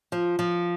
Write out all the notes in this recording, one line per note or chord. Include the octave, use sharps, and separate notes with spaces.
F3
F3